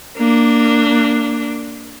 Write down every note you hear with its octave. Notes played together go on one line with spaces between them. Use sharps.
A#3 D4